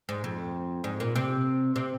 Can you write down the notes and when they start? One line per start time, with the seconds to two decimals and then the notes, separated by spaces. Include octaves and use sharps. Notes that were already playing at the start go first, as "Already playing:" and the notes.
0.09 G#2
0.24 F2
0.84 G#2
1.00 A#2
1.16 C3
1.76 C3